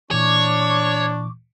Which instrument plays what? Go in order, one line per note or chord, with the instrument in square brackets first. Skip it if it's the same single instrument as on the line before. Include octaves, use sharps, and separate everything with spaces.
[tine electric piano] A#2 E3 [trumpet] D4 [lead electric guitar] C#5 [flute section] C#6 D6